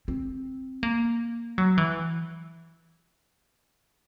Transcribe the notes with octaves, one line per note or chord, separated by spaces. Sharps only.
C4
A#3
F#3
E3